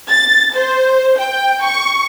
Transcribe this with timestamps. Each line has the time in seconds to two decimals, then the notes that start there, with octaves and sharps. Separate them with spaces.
0.10 A6
0.54 C5
1.18 G5
1.64 C#6